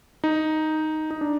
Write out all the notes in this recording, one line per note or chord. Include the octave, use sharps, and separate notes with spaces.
D#4
D#4
D4